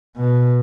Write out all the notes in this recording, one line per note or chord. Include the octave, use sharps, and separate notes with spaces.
B2